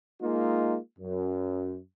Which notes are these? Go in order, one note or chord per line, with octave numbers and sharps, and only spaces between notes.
G#3 A#3 D#4 F4
F#2